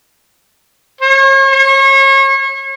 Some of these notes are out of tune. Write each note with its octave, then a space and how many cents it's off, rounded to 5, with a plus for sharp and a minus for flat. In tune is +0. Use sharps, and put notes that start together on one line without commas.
C#5 -40
C#5 -35